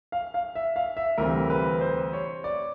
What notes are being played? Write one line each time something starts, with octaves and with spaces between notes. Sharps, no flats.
F5
F5
E5
F5
E5
D2 C3 E3 G3 C4 A#4
B4
C5
C#5
D5